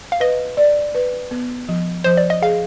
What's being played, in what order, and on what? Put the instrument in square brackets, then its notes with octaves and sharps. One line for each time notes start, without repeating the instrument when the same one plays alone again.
[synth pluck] F5
[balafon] B4 [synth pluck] D#5
[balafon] D5
B4
B3
F3
[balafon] F3 [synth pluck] C5
[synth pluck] D5
D#5
[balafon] G#4 [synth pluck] F5